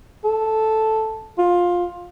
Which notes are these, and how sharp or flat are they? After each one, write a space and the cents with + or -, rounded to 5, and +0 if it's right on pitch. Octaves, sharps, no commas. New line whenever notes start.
A4 -5
F4 +15